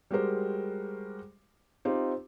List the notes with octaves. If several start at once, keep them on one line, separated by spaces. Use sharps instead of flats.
G3 G#3 F#4 G4 A#4 C5
C4 D#4 F4 G4